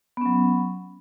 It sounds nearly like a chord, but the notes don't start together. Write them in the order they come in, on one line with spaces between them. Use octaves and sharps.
B3 C#4 F#3